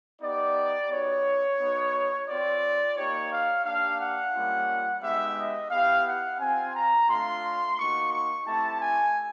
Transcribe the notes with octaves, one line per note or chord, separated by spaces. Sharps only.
B3 D#4 G4 D5
B3 D#4 F#4 C#5
B3 D#4 F#4
C4 F4 D5
A#3 D#4 G4 C#5
F5
A#3 D4 G4 F5
F#5
G3 A#3 C#4 F4
G#3 B3 D#4 G4 E5
D#5
B3 E4 G4 F5
F#5
C4 F4 G#5
A#5
A3 D4 F4 C6
A#3 D#4 F#4 C#6
C#6
A3 C4 E4 G4 A5
G#5